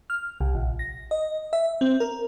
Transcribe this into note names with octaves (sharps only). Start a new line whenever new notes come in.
F6
C2
A#1
A#6
D#5
E5
C4
A#4